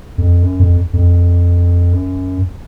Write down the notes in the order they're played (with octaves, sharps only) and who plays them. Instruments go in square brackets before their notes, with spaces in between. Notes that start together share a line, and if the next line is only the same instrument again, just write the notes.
[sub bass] F2
F#2
F2
F2
F#2